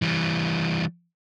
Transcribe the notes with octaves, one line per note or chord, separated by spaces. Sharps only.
E3 G3